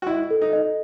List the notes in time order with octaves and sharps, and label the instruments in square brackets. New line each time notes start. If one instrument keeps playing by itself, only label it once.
[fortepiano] F#4
[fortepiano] E4 [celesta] D#5
[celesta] A4
[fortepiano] D#4
[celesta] D#5